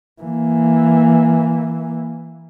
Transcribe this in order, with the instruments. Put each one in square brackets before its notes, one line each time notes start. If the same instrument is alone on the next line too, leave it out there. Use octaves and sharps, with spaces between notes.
[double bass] E3 A#3